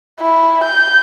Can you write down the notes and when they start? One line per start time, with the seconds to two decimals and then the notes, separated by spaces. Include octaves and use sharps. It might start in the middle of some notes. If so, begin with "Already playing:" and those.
0.21 E4
0.64 G6